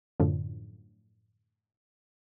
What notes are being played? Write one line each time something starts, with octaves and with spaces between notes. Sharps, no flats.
F#2 A2 D3 F3